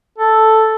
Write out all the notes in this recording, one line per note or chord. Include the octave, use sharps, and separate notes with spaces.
A4